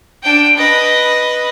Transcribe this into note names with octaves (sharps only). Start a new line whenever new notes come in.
D4 G5
B4 D#5